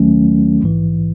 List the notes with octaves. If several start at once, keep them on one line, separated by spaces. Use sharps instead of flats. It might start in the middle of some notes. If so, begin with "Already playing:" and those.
Already playing: D#2 D#3 F#3 A3 C#4
A#1 G#2 E3